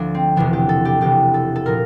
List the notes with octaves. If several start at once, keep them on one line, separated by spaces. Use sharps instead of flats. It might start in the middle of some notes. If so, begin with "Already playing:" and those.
Already playing: D2 F3 D4
C4
E1 E2 C3 E3 D4
G4
A4
G4
E1 E2 C3 E3 G4
A4
A4
A#2 F3 A#4